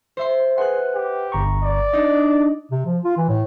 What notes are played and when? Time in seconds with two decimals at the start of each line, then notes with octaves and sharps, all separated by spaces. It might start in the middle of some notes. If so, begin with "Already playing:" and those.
0.17 C5 E5 C6
0.58 G#4 B4 F#5 C6 F#6
0.94 G4
1.32 G1 A#5 C#6
1.63 D5
1.93 D4 D#4 D#5
2.71 C3
2.86 F3
3.04 F4
3.17 E3
3.29 A2